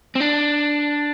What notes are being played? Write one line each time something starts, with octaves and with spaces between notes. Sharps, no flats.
C4
D4